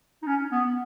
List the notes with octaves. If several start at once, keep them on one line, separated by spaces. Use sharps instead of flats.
D#4
C#4
B3